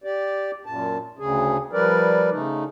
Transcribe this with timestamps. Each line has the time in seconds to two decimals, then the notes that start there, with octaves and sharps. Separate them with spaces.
0.04 G4 D5
0.66 F#2 A#2 A5
1.19 D2 C#3 G#4
1.73 F3 G3 A#4 B4 D5
2.31 C#3 A3 D#4